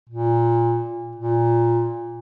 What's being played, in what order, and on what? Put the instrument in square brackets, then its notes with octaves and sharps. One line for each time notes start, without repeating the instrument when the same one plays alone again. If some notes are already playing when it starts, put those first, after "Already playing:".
[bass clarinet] A#2
A#2